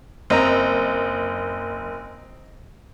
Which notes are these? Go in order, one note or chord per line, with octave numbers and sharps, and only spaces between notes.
F#1 C4 D#5 A#5